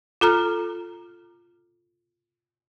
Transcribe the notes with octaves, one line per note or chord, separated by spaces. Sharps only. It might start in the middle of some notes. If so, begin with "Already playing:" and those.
F4 A4 A#5 F6